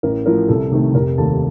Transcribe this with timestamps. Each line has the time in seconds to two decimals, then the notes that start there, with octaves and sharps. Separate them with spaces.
0.03 A1 A#4
0.26 A2 F3 A#4
0.48 C2 A4
0.71 C3 D#3 A3
0.94 F1 A#4
1.18 D#2 D#3 A3 A5